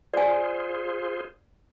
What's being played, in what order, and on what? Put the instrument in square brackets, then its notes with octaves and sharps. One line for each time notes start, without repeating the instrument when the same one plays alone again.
[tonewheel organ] F4 G#4 C5 [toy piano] D5 G#5